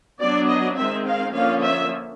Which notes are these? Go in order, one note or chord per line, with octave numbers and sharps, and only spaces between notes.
F#3 B3 D4 D5
D#5
D#3 G#3 C4 E5
F5
D3 F3 A#3 C#4 F5
E5